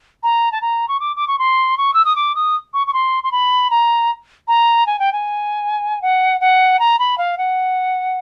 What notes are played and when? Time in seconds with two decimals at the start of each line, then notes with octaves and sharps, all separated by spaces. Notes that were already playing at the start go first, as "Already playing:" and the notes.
0.23 A#5
0.52 A5
0.61 A#5
0.88 C#6
1.00 D6
1.16 D6
1.28 C#6
1.39 C6
1.77 C#6
1.94 E6
2.05 D#6
2.16 D6
2.35 D#6
2.73 C#6
2.87 C#6
2.93 C6
3.23 C6
3.31 B5
3.70 A#5
4.48 A#5
4.86 G#5
4.99 G5
5.12 G#5
6.02 F#5
6.40 F#5
6.79 A#5
6.99 B5
7.18 F5
7.38 F#5